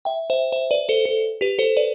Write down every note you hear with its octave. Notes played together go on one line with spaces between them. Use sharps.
E5 G5
C5 E5
C5 E5
B4 D5
A4 C5
A4
G4 B4
A4 C5
B4 D5